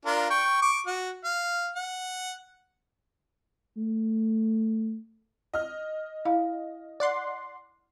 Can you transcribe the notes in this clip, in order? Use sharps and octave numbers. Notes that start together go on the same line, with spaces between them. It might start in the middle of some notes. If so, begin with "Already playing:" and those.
D4 F4 A#4
G5 C#6
C#6 D6
F#4
F5
F#5
A3
D#5 F6
E4 F5
D5 F#5 C6